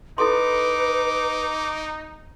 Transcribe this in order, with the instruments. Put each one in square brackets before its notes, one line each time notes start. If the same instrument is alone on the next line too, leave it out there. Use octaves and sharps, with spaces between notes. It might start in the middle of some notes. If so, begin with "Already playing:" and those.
[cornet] D#4 [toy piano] E4 A4 C6 [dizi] B4 [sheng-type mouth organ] D6